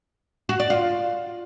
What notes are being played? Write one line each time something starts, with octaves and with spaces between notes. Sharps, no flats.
F#4
D5
F4